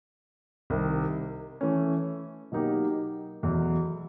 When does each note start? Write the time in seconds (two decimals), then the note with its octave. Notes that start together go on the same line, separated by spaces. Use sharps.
0.70 C2 C3 D#3
1.61 E3 A3 C#4
2.52 B2 F#3 A#3 D#4 G4
3.42 E2 B2 F#3 A3